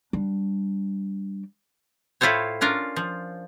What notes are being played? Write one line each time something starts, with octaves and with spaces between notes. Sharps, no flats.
G3 D4
A2 E4 F4 A4 C5 C#5
C#4 D4 F4 A#4
F3